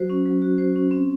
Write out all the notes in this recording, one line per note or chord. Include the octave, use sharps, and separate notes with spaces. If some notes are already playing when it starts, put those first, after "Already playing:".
Already playing: F#3 F#4 C5
C#4
F#3
F#4
C5
C#4
C4